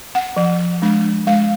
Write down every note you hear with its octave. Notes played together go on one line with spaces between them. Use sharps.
F#5
F3
G#3 D4
G#3 F5